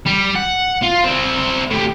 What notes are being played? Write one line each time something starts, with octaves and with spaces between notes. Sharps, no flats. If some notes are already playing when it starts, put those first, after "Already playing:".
G3
F#5
F4
C4 E4
A2 G4